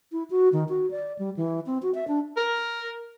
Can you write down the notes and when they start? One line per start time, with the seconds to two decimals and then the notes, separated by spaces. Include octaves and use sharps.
0.12 E4
0.30 F#4
0.53 D#3
0.69 F#4
0.91 D5
1.19 G3
1.37 E3
1.66 C4
1.82 F#4
1.94 E5
2.08 D4
2.37 A#4